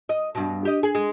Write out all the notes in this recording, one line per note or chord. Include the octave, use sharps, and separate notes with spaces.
D#5
G2 B2
G4 D#5
G#4
G#3